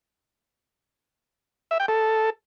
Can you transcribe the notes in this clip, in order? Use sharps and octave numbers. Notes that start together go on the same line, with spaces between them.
E5
G5
A4